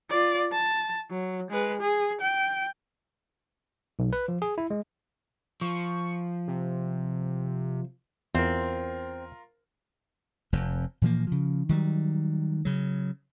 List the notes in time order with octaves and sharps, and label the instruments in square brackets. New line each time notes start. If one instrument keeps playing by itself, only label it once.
[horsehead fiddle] F4 D5
A5
F#3
G#3 B4
G#4
G5
[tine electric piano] B1
B4
F3
G#4
E4
G#3
[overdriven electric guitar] F3 [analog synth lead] C#6
[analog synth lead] C3
[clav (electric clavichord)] E2 [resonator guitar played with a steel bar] C4 [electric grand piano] F4 A#4
[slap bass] F1 F2
A#2 E3 F3 A#3
C#3 F3
D#3 F#3 G3
C#3 F#3